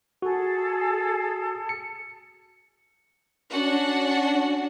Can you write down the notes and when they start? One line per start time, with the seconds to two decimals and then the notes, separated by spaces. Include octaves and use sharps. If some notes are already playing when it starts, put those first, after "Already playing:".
0.22 F#4 G#4 A4
1.69 C#7
3.51 C#4 D4 F#4 F#5